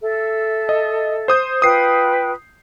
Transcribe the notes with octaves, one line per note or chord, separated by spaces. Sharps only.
A4 E5
D#5
C5 D#6 G6
F4 B4 G5 D#6 C7